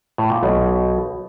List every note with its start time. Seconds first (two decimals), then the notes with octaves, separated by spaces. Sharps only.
0.18 A2
0.30 A#2
0.43 B1 B2